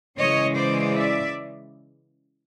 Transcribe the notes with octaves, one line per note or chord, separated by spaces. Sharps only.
C#3 E3 G#3 C#5 D#5
C5 D5
D5 E5